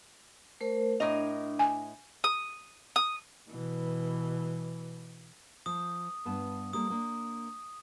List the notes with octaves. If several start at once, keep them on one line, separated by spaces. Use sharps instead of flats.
A3 A#4 C5
A2 D4 A#4 D#5
G#5
D#6
D#6
B2 E3
F3 D#6
G2 B3 A5
G3 A#3 A4 D#6
A#3 D4